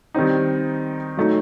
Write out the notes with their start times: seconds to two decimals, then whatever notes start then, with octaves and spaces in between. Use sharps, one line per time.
0.14 D#3 G3 C4 D#4
1.17 F#3 A3 D#4